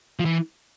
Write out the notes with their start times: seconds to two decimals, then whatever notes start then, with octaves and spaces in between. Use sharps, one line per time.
0.19 F3
0.25 E3